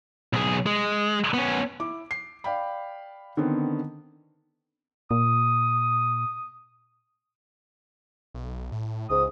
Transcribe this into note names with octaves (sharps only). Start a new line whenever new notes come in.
B1 G#4
G#3
B3 C#4
E4 D6
C7
D5 F5 G5 B5
D3 D#3 B3 C4
A#2 D#6
B1
A2
C#2 G#2 D#6